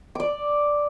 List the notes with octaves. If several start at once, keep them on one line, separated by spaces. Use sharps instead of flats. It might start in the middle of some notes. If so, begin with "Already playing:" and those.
D5 D6